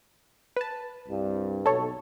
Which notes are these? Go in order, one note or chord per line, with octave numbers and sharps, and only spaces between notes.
B4 A5
C2 G2
B1 A4 C#5